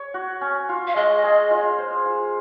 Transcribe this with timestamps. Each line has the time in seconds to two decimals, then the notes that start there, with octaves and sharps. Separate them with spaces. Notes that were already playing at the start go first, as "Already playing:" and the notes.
Already playing: C#5
0.14 F#4
0.41 C#4
0.69 F4
0.88 F5
0.96 G#3 D#5
1.23 G#4
1.51 F4
1.78 C5
2.06 F4